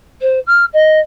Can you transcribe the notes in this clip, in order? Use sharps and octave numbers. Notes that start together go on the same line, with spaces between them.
C5
F6
D#5